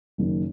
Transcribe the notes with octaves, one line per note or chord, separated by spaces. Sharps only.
F#1 F#2 D#3